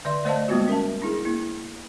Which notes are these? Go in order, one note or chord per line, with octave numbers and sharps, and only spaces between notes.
D3 D5 E5 C6
A3 C5 D5 D#5 F5 A5
G3 G#3 A#3 B3 F4 F#4
C#4 A#4 E5 A5
D4 E4 G#4
A#3 E4